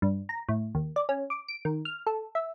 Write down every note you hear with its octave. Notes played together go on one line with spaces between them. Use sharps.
G2
A#5
A2
D#2
D5
C#4
D6
D7
D#3
F6
A4
E5